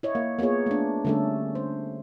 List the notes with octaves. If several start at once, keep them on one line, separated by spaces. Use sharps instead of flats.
E4 C#5 D#5
A#3
A#3 B3 F4 G#4 C#5
A3 D4
D3 G3 A3 C#4 A4
C5